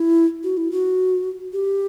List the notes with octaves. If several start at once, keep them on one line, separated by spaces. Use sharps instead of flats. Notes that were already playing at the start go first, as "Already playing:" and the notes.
Already playing: E4
F#4
E4
F#4
G4